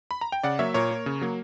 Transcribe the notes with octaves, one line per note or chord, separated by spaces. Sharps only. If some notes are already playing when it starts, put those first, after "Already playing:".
B5
A#5
G5
C#3 D5 F#5
F#3 A#3 C#5 E5
A#2 A#4 C#5
A#3
C#3
F#3 A#3